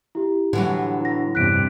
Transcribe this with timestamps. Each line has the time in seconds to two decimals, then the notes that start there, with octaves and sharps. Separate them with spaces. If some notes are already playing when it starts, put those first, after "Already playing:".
0.15 E4 G4
0.53 A2 D3 E3 F#3
1.01 E4 A#6
1.35 E2 G2 C3 F#6 B6 D7